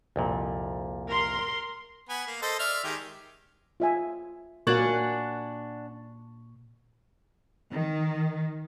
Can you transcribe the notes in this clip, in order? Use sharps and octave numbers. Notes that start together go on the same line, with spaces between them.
C2 F2 A#2
A#4 C6
B3 G#5 B5
A#3
A4 C5 D#5
D5 E5 F6
D#3 G#3 G4
F4 E5 G#5
A#2 A#3 D4 F#4 A#4 F#5 G#5 C#6
D#3